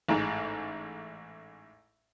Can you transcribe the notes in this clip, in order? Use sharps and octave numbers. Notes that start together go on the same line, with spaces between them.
A1 G#2